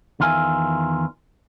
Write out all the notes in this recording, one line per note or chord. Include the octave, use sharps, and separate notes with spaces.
E2 D#3 F4 E5 G#5